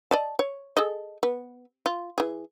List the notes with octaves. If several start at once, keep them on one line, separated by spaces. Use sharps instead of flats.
D5 D#5 A5
C#5
G#4 A4 D#5
B3
F4
E3 G#4